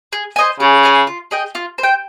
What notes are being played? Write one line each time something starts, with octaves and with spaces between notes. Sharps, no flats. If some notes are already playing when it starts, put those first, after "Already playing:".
G#4
C5 D#5 G#5
C#3 G#4
C#5 F5 G#5
F4
G#4 D#5 G5
F4
C5
G5